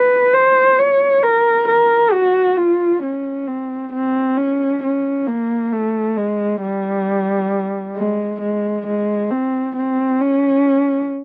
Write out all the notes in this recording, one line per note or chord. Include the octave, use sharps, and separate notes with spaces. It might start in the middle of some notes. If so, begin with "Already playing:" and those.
Already playing: B4
C5
C#5
A#4
A#4
F#4
F4
C#4
C4
C4
C#4
C#4
A#3
A3
G#3
G3
G#3
G#3
G#3
C4
C4
C#4